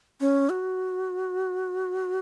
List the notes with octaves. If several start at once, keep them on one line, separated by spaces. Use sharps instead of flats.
C#4
F#4